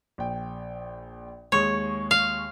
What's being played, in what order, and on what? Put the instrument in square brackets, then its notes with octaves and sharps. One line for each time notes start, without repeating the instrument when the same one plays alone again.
[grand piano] A#1 G5
[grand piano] D#2 G#3 C#6 [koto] C#5
[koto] F5